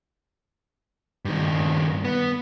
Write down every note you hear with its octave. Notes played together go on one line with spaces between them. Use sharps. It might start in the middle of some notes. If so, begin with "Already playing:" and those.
G2 D#3
B3